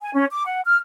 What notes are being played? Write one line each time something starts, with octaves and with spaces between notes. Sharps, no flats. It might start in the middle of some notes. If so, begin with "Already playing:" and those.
G#5
C#4
D6
F#5
F6